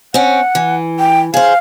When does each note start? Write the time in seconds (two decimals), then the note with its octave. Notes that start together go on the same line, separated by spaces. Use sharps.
0.14 C4 C#4 F#5
0.55 E3
0.99 G5
1.34 G#4 C5 F5